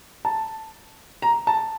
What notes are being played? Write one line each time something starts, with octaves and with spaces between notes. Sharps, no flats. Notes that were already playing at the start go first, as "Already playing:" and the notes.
A5
A#5
A5